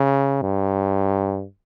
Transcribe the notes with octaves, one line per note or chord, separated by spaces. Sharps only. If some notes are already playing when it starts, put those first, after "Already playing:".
Already playing: C#3
G2